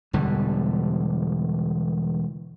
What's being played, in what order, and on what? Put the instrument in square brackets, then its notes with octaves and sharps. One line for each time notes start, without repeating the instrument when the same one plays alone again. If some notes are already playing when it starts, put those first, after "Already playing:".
[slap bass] E1 E2 D3 G3